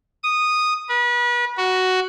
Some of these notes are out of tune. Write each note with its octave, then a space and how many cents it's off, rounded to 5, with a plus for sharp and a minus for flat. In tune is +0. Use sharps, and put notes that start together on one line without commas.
D#6 -10
B4 -35
F#4 +5